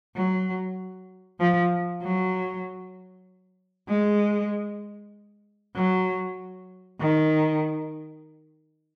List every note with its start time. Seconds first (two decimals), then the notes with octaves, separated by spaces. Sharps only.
0.16 F#3
1.39 F3
2.02 F#3
3.88 G#3
5.76 F#3
7.00 D#3